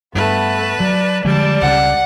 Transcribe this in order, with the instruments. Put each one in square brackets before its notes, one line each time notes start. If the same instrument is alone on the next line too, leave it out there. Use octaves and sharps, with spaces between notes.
[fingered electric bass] G2 [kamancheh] A3 B3 [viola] B4 A5
[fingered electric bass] F#3 [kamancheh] D5
[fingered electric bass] D3 F3 G#3 [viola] G3 A5 [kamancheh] D5
[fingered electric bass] C#2 C#3 [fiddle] F#5